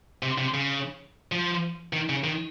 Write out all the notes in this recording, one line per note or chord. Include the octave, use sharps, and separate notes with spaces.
C3
C3
C#3
F3
D#3
C#3
D#3